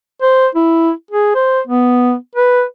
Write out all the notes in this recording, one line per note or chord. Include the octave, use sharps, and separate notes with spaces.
C5
E4
G#4
C5
B3
B4